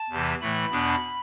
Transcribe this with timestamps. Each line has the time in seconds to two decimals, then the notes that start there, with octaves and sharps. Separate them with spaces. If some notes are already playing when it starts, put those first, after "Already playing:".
Already playing: A5
0.10 E2 C3 E3
0.41 A2 E3 A3 B5
0.71 E2 B2 B3 D4